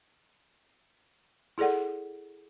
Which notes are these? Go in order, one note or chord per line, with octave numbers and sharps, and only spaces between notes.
E4 G#4 A4 D5 F#5